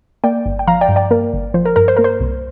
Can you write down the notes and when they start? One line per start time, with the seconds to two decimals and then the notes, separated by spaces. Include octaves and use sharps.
0.24 A#3 D5 G5
0.46 G1
0.59 G5
0.67 F3 F5 A#5
0.81 D5 G5
0.89 G2
0.96 D5 G5
1.11 A#3 A#4
1.33 G1
1.54 F3 C5
1.65 A#4
1.76 G2 A#4
1.88 C5
1.97 A#3 A#4
2.04 C5
2.20 C2